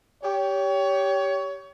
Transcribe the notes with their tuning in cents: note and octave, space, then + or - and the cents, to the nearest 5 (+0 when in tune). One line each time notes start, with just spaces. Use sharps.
G4 +0 C#5 +25